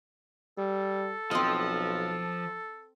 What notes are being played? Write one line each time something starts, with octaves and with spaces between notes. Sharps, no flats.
G3 A4
B1 F3 C4 D#5